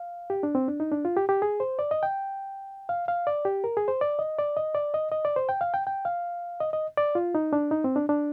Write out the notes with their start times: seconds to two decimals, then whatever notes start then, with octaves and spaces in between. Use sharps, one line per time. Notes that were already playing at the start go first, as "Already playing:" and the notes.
Already playing: F5
0.30 G4
0.43 D4
0.55 C4
0.68 D4
0.80 D#4
0.92 D4
1.05 F4
1.17 G4
1.29 G4
1.42 G#4
1.60 C5
1.79 D5
1.91 D#5
2.03 G5
2.89 F5
3.08 F5
3.27 D5
3.45 G4
3.64 A#4
3.77 G#4
3.88 C5
4.01 D5
4.19 D#5
4.39 D5
4.57 D#5
4.75 D5
4.94 D#5
5.12 D#5
5.25 D5
5.36 C5
5.49 G5
5.61 F5
5.74 G5
5.87 G5
6.05 F5
6.60 D#5
6.73 D#5
6.97 D5
7.15 F4
7.35 D#4
7.53 D4
7.71 D#4
7.84 C4
7.96 D4
8.09 D4